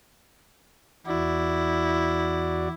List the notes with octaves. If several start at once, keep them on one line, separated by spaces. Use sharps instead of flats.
E2 E4 F#4 D5